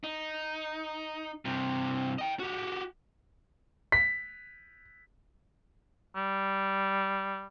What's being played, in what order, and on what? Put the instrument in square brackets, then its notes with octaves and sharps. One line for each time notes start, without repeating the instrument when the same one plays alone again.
[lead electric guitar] D#4
G2 C3
D#5 G5
F#4 G4
[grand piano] B6
[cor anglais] G3